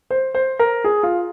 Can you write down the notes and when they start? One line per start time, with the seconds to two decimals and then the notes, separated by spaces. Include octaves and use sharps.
0.11 C5
0.35 C5
0.59 A#4
0.84 G#4
1.03 F4